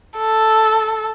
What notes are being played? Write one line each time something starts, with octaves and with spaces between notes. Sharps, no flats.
A4